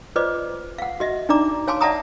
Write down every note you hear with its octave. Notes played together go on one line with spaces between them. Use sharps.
F4 B4 C5 D5 D#5 D6
F5 F#5
F#4 D#5 E5
D4 D#4 D5 A#5 D6
C#5 F5 G#5 A5 C6 D6
D5 E5 F#5 A5 A#5 D#6